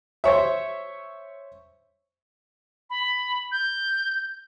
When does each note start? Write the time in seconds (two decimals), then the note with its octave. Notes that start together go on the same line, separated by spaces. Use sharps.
0.24 C5 C#5 E5
2.90 B5
3.51 G6